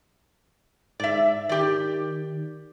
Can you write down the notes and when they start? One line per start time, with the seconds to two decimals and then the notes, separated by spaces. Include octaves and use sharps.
1.00 G#2 D5 E5
1.49 D#3 G4 D5